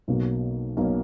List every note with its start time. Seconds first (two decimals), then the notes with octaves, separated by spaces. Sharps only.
0.08 B1 B2 A#3 C#4
0.77 B1 B2 A#3 C#4